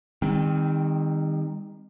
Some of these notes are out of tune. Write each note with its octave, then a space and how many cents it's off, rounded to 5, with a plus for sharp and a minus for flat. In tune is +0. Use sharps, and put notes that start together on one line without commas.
D#3 +0 G3 +45 C4 +0